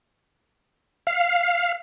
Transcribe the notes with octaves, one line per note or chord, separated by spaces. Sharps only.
F5